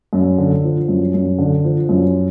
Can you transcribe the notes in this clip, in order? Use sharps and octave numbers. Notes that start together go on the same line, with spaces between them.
F#2
D3
F3
F#2
F#2
D3
F3
F#2